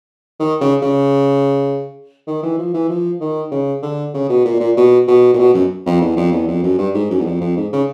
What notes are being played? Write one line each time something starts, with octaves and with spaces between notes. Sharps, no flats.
D#3
C#3
C#3
D#3
E3
F3
E3
F3
D#3
C#3
D3
C#3
B2
A#2
A#2
B2
B2
A#2
B2
F#2
F2
E2
F2
E2
F2
F#2
G2
G#2
F#2
E2
F2
F2
G#2
C#3